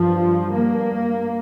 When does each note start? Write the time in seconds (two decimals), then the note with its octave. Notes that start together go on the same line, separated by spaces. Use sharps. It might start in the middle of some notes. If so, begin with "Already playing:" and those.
Already playing: G2 F3
0.54 A#3